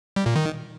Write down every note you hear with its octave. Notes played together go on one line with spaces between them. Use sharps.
G3
A#2
D#3